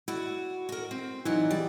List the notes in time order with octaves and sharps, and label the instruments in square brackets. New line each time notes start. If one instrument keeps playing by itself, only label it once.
[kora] E4 [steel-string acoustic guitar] F#4 D5
[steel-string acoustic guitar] F#4 A#4
C4
[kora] E3 [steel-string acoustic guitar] F#3 D#4 D5
[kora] G3 G#4 [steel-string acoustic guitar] D5